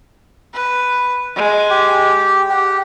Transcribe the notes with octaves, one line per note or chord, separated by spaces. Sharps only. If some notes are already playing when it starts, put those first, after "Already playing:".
B4
G#3
G4
G4 F#5